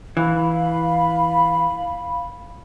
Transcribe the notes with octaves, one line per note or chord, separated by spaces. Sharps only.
E3 F5 B5